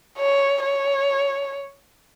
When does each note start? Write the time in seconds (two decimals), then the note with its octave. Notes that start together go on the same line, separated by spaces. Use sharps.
0.18 C#5
0.63 C#5